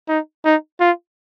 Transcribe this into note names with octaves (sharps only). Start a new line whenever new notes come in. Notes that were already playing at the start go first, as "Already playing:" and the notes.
D#4
D#4
F4